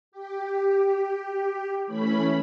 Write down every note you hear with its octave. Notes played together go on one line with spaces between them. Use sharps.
G4
E3 A3 C#4 B5